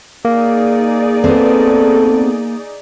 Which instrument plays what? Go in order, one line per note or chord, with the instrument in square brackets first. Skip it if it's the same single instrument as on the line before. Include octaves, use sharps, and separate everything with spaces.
[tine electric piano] A#3 [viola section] D#4 G#4 D5
[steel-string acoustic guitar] B3 C4 [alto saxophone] A4